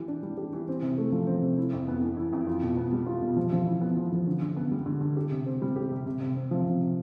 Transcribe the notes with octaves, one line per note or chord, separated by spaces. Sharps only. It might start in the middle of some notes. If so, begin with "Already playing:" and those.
Already playing: E3 G4
D4
G3
G4
E3
C4
C3
A3
F3
C4
C3
E4
F2
B3
E3
E4
F2
F4
B2
B3
G3
F4
B2
F3
F3
E4
B3
F3
F3
D3
D3
B3
G3
D3
D3
G4
C3
C4
G3
G4
C3
C3
C3
C4
F3
C3
C3